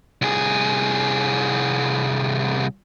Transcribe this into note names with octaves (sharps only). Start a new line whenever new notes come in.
C2 G#4